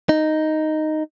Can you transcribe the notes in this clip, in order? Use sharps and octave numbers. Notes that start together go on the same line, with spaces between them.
D#4